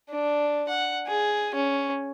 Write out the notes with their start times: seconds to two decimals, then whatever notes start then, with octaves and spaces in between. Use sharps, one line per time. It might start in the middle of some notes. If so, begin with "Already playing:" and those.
0.10 D4
0.69 F#5
1.07 G#4
1.55 C#4